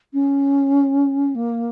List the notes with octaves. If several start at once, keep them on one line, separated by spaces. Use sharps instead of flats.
C#4
A#3